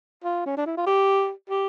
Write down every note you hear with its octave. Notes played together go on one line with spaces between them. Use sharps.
F4
C#4
D4
E4
F4
G4
G4